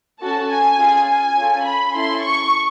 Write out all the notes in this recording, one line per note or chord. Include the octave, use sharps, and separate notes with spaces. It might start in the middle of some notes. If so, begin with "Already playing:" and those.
C#4 F#4 A4 A5
G#5
C#4 F4 G#4
G#5
C#4 F4 A4
B5
C#4 E4 A4 C6
C#6